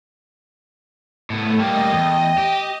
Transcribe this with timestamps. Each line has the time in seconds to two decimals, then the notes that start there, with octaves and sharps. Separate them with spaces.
1.30 A2 A3 B3
1.60 G3 A#3 D#5 G5
1.92 E2
2.38 G4